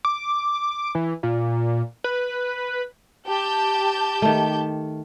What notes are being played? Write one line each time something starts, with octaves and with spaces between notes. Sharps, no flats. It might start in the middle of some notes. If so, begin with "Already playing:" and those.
D6
E3
A#2
B4
G4 A5 G6
D#3 A3